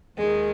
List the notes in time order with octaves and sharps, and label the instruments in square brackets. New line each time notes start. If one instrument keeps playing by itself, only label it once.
[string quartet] D#2 D#3 G#3